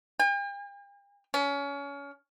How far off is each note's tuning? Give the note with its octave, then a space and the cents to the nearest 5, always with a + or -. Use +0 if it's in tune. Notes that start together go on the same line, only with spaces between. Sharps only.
G5 +45
C#4 +25